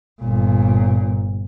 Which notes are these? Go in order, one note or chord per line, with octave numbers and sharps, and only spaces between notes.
G1 A#2